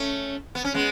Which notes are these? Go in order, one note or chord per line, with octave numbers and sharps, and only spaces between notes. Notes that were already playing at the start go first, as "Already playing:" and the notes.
Already playing: A3 C#4
B3
C#4
G#3 B3